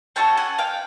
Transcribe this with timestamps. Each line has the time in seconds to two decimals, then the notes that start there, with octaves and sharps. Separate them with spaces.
0.16 C#4 F#4 A4 G5 A5
0.37 F#5 G#5
0.59 F5 G5